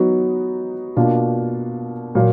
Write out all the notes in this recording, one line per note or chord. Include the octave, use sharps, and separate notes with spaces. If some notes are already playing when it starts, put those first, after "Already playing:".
Already playing: F#3 B3 D#4 F#4
B2 A#3 D4 F4
A#2 F#3 A#3